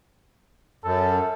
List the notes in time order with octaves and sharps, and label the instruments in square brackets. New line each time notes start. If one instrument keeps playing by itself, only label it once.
[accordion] F#2 [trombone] A4